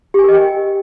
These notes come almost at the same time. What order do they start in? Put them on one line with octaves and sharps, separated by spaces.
G4 G#5 A#4 D#5 G5